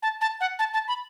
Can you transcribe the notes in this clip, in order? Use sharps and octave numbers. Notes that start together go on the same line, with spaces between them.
A5
A5
F#5
A5
A5
B5